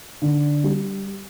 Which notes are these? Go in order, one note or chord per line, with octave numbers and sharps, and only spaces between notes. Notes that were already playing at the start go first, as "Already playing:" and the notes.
D3
G3